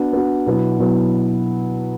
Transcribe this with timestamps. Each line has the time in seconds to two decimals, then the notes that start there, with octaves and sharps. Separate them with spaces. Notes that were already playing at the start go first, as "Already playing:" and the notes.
Already playing: B3 D4 F#4
0.13 B3 D4 F#4
0.47 B2 F#3 B3 E4
0.79 B2 F#3 B3 E4